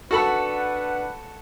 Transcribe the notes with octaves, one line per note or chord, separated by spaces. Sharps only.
D4 F#4 A4 B4 F#5 B5